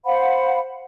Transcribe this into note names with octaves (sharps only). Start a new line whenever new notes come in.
C5 F5 F#5 B5